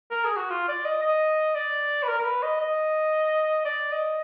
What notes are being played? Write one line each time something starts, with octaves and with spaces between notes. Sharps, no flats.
A#4
G#4
F#4
F4
D5
D#5
D#5
D5
B4
A#4
A#4
B4
D#5
D#5
D5
D#5